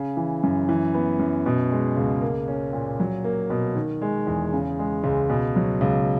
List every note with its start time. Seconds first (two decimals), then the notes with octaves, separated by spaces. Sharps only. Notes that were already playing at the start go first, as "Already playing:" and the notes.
Already playing: C#3
0.17 E3
0.43 F#2
0.69 E3
0.94 B3
1.19 F#2
1.46 B2
1.72 G#3
1.97 C#2
2.22 A#3
2.48 C#4
2.73 A#2
3.00 F#3
3.24 A#3
3.50 B2
3.75 D#3
4.02 G#3
4.27 E2
4.53 C#3
4.79 G#3
5.04 C#2
5.29 B2
5.56 F#3
5.81 C#2